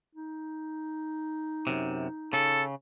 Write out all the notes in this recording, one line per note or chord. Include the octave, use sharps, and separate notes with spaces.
D#4
F#2 C3
C#3 A4